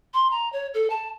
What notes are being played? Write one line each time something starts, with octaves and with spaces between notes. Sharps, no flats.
C6
A#5
C#5
A4
A5